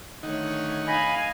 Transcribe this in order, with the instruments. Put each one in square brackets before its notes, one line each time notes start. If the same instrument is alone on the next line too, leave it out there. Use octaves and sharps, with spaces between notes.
[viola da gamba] D3 A3 C#5 [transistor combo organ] D#3 D#4 F#5
[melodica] D#5 B5 [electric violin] F5 G#5